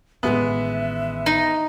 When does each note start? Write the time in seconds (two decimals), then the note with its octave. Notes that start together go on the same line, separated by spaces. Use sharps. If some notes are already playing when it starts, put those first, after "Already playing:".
0.23 A1 D#3 G#3 B3 E5
1.26 D#4